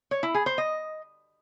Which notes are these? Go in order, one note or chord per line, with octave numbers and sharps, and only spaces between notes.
C#5
E4
G#4
C5
D#5